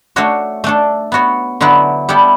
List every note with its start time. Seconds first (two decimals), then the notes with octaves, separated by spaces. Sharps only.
0.16 A3 D4 F#4 C#5
0.64 A3 D4 A4
1.12 B3 F#4 C#5
1.61 D3 F#3 B3 E4 B4
2.09 G3 B3 E4 A4